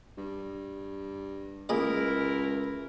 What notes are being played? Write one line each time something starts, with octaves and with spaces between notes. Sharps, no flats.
G2
C#2 A#3 E4 G#4 A#4 D#5